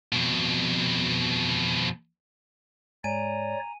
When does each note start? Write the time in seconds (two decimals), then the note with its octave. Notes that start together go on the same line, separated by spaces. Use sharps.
0.13 F2 B2
3.04 G#2 G#3 C#5 D5 G#5 A#5 D#7